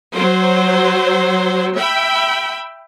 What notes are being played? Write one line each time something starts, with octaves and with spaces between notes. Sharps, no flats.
F#3 C5
E5 G5 B5